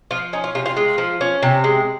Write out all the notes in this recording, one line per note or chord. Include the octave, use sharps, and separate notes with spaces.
F3 F4
C#4 D#4
F4
C3 F4
F4
G#3 F4
F3
C#4
C3
G#3